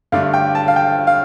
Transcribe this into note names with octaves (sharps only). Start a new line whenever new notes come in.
G2 D3 A3 D4 F5
G5
A5
F5
G5
F5